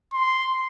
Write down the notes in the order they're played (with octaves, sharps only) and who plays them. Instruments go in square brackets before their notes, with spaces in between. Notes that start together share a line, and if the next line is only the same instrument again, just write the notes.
[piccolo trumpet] C6